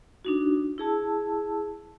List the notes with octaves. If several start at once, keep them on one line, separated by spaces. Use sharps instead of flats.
D4 D#4 F#4
E4 G#4 A5 E6